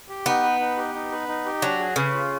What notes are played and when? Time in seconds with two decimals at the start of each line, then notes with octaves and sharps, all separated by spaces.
0.09 G4
0.26 B3 D#4
0.43 B4
0.60 D#4
0.77 G4
0.94 D#4
1.11 B4
1.28 D#4
1.45 G4
1.62 F#3 D4
1.79 G#4
1.96 C#3 B4
2.14 F4